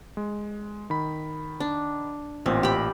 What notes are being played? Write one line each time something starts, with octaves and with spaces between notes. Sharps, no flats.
G#3
D#3 B5
D4
A1 A#2 C4
G4 B5